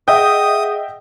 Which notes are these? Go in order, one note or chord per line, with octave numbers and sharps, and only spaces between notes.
G#4 D#5 E5 F#5 G5 D#6